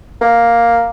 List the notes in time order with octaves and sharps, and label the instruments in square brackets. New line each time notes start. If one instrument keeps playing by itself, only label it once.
[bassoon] A#3